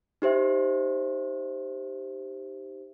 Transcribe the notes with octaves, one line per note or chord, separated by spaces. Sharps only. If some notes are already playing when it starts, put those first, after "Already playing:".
D#4 G4 C5 E5